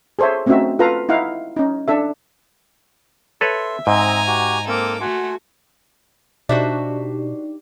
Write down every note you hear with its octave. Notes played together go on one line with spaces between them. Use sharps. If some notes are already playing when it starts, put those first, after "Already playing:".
G#4 A4 C5 C#5 E5
A3 C4 C#4 D#4 F#4 E5
F4 A4 B4 F5 A#5
D#4 E4 F5 F#5
C#4 D#4
D4 A4 E5
A4 B4 C#5 E5 C6
G#2 C4 D#4 D#5 G#5 A#5
F#4 G4
A#3 C4 A4 D6
A3 F#4 F#5 G#5 C6
B2 D4 D#4 F#4 G4 C5 D5 E5